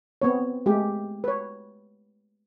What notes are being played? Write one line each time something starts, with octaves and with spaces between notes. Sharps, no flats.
B3 C4 C#5
G#3 A3 G4
B4 C#5